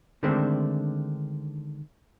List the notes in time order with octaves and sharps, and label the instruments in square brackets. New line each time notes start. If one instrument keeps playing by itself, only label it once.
[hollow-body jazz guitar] D3 D#3 G#3 A3 C4 D4